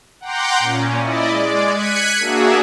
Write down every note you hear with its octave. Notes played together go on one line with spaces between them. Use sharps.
F#5 G5 A#5 C6 D6 G6
A#2 C#4
E4 D5 D#5
G#3 D5
F#6 G#6 B6 C#7 D#7
A#3 D4 F#4 G#4 E5